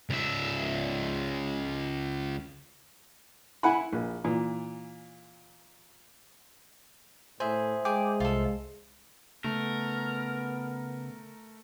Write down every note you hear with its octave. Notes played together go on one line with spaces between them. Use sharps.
C#2 E5
E4 F#5 G#5 B5
A#1
A#2 E3
A2 G#4 C5 E5
G#3 G#4 G5 D6
C2 F4 A4
C#3 A3 B3 A#4